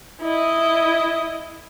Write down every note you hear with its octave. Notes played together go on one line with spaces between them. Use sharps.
E4 D#5